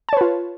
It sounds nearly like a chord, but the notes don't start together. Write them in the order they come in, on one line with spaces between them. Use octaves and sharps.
A5 C#5 B4 F4